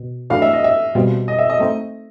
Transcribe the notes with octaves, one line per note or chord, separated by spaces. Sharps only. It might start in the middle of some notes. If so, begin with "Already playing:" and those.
Already playing: B2
E3 A3 D4 F#4 B4 F5
E5
D#5
E5
B2 G3 C4 F4
D#5
E5
D#5
A3 C4 D#4